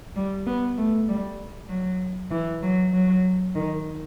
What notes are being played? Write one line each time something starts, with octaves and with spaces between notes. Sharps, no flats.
G3
B3
A3
G3
F#3
E3
F#3
F#3
D#3